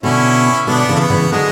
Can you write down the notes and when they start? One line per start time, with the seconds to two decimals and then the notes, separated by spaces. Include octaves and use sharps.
0.03 B2 D3 C#4 E4
0.67 B2 D3 B3 D4
0.89 C#3 E3
0.96 A3
0.99 B3
1.10 C#3 E3
1.32 D3 F#3 G#3